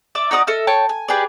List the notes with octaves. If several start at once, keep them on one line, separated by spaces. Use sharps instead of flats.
D5 E5 D6
D#4 F#4 D5 D#6
A4 D#5 E5 F6
C#5 G5 A5
G#5
G4 G#4 B4 D5